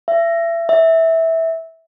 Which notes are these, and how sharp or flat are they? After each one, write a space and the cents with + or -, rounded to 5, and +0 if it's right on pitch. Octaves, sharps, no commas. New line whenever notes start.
E5 +30
E5 -15